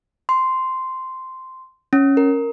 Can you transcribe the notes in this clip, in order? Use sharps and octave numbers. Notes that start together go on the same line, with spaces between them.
C6
C#4
A#4